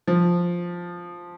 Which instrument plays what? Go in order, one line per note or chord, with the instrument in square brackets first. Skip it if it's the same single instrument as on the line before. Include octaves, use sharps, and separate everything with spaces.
[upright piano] F3